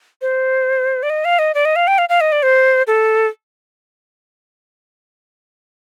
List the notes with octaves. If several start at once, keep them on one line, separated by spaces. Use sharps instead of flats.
C5
D5
D#5
F5
D#5
D5
D#5
F5
G5
F5
F5
D#5
D5
C5
A4